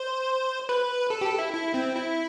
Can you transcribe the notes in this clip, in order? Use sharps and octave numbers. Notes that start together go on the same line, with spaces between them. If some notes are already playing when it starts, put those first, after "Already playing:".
Already playing: C5
B4
A4
G4
A4
E4
E4
C4
E4